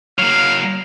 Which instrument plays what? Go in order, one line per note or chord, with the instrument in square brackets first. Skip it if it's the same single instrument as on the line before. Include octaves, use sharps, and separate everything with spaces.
[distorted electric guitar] F#3 A#3 [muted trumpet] F5